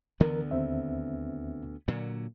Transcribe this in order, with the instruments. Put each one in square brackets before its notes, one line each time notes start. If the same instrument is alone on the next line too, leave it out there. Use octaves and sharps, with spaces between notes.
[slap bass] D2 D3 B3 [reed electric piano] E3 A#4
[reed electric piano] D#2 C4 E5
[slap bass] A#2 D3 F#3